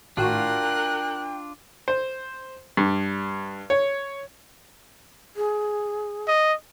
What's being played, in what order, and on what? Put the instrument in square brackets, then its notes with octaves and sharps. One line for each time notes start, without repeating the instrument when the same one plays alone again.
[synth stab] G#1 A2 F#4 [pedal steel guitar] D4 F4 [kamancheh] A#4 F#6 [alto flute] G5
[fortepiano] C5
G2
C#5
[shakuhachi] G#4
[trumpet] D#5